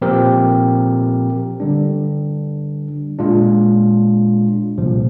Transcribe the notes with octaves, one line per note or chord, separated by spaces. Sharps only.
A#2 F3 C4 G4 A#4
D3 G3 D4
A#2 G#3 D4 F4
C2 A#2 F3